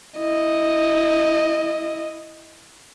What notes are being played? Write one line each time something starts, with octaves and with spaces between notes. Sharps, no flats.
E4 D#5